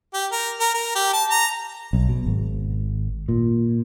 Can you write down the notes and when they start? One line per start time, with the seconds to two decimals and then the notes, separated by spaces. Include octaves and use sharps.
0.14 G4
0.32 A#4
0.60 A#4
0.74 A#4
0.95 G4
1.13 A5
1.30 A#5
1.93 B1
2.09 B2
2.26 G#1
3.29 A#2